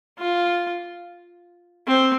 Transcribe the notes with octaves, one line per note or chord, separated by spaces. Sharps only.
F4
C4